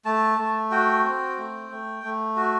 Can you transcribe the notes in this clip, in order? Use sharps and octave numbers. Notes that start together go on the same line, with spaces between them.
A3 A5
A3
F#4 G5
C4
A3
A3
A3
F#4